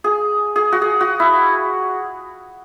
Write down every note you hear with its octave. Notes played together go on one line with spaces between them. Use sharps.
G#4
G#4
F#4
G#4
F#4
E4